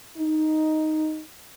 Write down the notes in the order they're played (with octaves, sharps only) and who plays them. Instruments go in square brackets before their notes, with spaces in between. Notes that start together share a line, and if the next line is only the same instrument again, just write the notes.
[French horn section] D#4